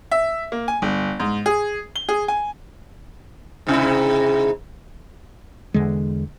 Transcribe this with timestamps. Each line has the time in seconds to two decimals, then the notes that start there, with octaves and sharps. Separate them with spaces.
0.11 E5
0.52 A#3
0.68 G#5
0.82 G1
1.20 G#2
1.46 G#4
1.96 G7
2.09 G#4
2.28 G#5
3.67 G#2 C3 E4
5.74 E2 D3 G#3